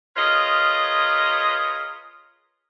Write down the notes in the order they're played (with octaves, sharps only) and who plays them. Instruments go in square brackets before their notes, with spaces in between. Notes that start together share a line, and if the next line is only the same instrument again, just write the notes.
[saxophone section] F4 G#4 A#4 B4 C#5 D#5